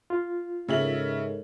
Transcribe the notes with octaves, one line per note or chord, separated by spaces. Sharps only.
F4
G#2 C#3 A4 A#4 C#5 E5 F#7